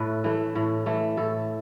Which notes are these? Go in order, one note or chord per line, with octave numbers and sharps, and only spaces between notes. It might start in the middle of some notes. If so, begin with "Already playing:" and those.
Already playing: A2 A3 A4 B4
E3 A3
A2
E3 A3
A2 A4